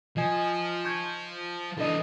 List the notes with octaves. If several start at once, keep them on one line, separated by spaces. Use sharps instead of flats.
F3 D#5 G#5
C#6 G6 G#6
E3 D4 A4 D#5